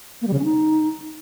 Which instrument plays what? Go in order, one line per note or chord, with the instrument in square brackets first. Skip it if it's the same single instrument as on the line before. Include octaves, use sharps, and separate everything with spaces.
[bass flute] A#3
G3
C#3
C#4
D#4